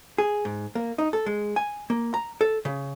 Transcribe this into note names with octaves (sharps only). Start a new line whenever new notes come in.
G#4
G#2
A#3
D#4
A4
G#3
G#5
A#3
A#5
A4
C#3